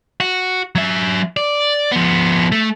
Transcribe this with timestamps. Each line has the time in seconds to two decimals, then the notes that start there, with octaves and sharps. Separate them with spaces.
0.20 F#4
0.75 F#3 E5
1.37 D5
1.92 F3 B3
2.52 A3